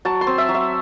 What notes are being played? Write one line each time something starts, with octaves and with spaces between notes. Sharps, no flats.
F#3 A5
C6
C4
E5
F#3
E5